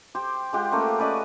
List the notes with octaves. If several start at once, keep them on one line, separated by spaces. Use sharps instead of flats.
G4 C5
G#3 F4 G4 F#5
A3 A#3 C#4 C5
C#4 B4 D5 D#5